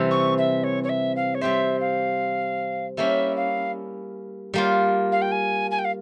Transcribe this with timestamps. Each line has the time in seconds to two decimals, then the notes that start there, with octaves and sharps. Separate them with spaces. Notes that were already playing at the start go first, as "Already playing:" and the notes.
Already playing: C3 E3 G3
0.11 C#6
0.38 E5
0.64 C#5
0.83 C#5
0.89 E5
1.16 F5
1.34 C#5
1.41 G3 C4 G4 C5 E5
1.80 F5
2.97 G3 A#3 C#4 E4 E5
3.36 F5
4.54 G3 A#3 F4
5.12 F5
5.21 G5
5.31 G#5
5.71 G#5
5.78 G5
5.84 F5